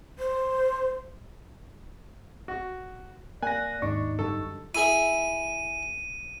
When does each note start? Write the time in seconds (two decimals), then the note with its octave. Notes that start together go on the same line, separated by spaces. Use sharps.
0.19 C5
2.48 F#4
3.42 A#3 D5 G#5 F#6 A#6
3.82 D#2 G#2 D4 D#4 C#6
4.19 F#2 D3 G3 A4
4.75 E4 G#4 E5 D#7